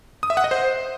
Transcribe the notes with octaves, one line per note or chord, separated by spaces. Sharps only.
D#6
E5
F#5
D#5
C5